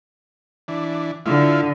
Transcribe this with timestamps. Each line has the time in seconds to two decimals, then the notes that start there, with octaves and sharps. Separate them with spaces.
0.68 E3 D4
1.26 D3 E4 F4